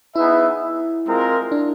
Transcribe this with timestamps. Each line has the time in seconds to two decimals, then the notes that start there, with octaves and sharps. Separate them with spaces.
0.15 B3 D#4 E4 G#4 B4 E5
1.06 G#3 C4 F4 A#4
1.52 D4